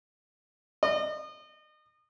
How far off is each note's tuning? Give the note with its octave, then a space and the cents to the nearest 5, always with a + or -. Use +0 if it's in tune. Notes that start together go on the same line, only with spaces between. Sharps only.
D#5 -35